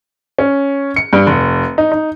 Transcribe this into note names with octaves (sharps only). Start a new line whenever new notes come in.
C#4
C#7
G2
F1
D#4
D#4